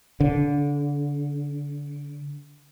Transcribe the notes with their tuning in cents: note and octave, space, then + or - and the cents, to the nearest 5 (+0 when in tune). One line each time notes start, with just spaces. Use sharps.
D3 -25